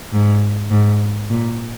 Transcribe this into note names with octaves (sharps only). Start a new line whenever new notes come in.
G#2
G#2
A#2